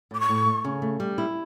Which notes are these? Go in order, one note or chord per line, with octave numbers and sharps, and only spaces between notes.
A2 D6
C#6
A2
A3
C#3
A3
G3
E4